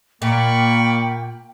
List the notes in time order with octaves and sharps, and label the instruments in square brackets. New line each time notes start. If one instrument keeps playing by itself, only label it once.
[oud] A#2 [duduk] A#3 [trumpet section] D5 B5 C#6 [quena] G5